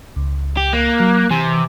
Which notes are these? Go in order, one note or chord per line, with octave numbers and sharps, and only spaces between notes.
C#2
G4
A#3 F#6
F#3
C3 E3 G#5